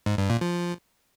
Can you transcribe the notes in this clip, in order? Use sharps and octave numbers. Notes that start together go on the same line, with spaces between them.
G#2
G2
A#2
F3